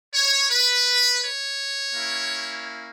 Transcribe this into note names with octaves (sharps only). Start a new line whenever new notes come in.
C#5
B4
C#5
A#3 C#4 E4